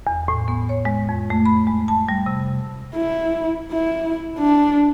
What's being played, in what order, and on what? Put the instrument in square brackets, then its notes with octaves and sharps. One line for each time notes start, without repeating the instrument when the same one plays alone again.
[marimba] E2
A2
B3
C#5
G#3
F2
A3
B5
G#3
A5
G3
C3
[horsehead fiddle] E4
E4
D4